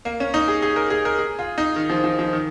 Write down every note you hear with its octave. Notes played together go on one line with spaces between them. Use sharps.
A#3
C#4
D#4
G#4
G#4
A#4
G#4
A#4
G#4
F4
D#4
D#3
F3
F3
F3
D#3